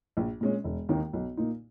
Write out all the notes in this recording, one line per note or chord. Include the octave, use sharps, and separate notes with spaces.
A#1
A#2 G#3 C#4
E1
D#2 D#3 A#3 D#4
B1
A#2 A#3 D#4